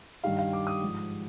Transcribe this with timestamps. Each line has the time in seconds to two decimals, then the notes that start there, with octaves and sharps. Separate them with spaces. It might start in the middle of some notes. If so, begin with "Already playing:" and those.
0.24 G2 D#3 G3 F5
0.38 F5
0.53 D6
0.67 D#6
0.81 G#2 F3